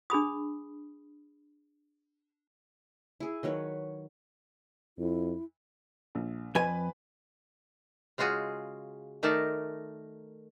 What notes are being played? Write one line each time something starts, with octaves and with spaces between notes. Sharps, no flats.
D4 G#4 B5 D#6
E4 G#4
D#3 F#3 B4 C#5
F2 E4
A#1
F2 B4 G#5
C#3 G#3 F4 F#4 G#4
D#3 A3 D#4 A#4 D5 A5